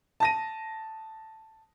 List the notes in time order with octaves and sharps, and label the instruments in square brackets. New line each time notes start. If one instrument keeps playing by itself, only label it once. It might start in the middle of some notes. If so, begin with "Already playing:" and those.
[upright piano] A5 A#6 D#7